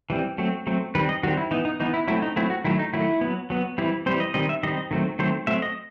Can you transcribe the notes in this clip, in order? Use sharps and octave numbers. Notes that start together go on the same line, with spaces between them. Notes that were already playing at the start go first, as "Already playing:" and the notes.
E3 G3 C4
F#3 A3 C4
F#3 A3 C4
D#3 G3 C4 B4
D#5
D#3 G3 C4 F#4
E4
E3 B3 D#4
D#4
E3 B3 D#4
E4
F#3 A3 C4 E4
D#4
F#3 A3 C4 E4
F#4
D#3 F#3 A3 E4
D#4
D#3 F#3 A3 E4
F#3 B3
F#3 B3
E3 G3 C4 E4
E3 G3 C4 C5
D#5
D#3 G3 C4 D#5
E5
D#3 G3 C4 D#5
D#3 F#3 A3 C4
D#3 F#3 A3 C4 C5
F#3 A3 C4 E5
D#5